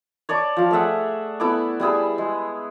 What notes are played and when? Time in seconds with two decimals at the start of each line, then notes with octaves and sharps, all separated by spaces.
0.29 C#5 D5 A5 D6
0.57 F3 F5
0.71 A3 G#4 E5 F#5
1.40 B3 E4 A4 D6
1.80 G3 E4 G#4 B4
2.18 G#3